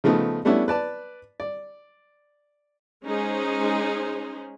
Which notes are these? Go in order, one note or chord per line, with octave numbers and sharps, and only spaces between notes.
C#3 F3 A3 B3 D#4
G3 A3 B3 C#4 D4 E4
B4 D5 A5
D5
G#3 C#4 D#4 G#4 C5